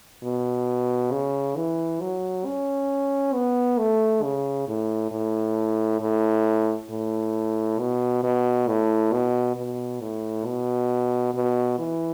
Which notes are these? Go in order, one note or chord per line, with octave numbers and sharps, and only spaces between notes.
B2
C#3
E3
F#3
C#4
B3
A3
C#3
A2
A2
A2
A2
B2
B2
A2
B2
B2
A2
B2
B2
E3